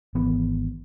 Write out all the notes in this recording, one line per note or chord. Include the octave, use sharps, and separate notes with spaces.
G#1 E3 B3